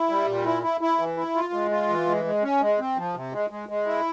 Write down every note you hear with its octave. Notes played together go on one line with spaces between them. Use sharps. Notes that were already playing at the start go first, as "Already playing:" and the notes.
Already playing: E4
G3
A#2
E4
E4
E4
E3
E4
F4
G#3
F4
E3
G#3
G#3
C#4
G#3
C4
F3
C3
G#3
G#3
G#3
E4